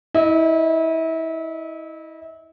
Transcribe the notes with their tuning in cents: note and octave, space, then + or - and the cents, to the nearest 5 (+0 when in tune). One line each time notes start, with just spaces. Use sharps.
E4 -30 D#5 -10